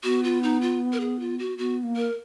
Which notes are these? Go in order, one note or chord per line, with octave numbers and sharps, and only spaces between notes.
B3 F#4
F4
D#4
F4
A#4
G#4
F4
F#4
B3 F#4
A#3
A#4